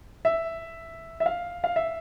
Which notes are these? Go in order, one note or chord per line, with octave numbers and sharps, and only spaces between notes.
E5
E5
F5
F5
E5